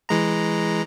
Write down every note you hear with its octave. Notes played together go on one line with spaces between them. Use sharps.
E3 G#3 A#5